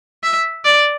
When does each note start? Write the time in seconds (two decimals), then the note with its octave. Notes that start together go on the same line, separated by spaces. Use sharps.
0.23 E5
0.64 D5